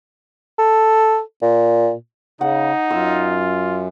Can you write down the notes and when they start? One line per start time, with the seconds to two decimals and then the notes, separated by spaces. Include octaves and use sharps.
0.59 A4
1.42 A#2
2.41 C#3 D#4 F#5
2.91 F#2 F4 E6